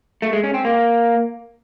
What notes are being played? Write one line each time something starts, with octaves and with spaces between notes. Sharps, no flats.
A3
G#3
C#4
C4
A#3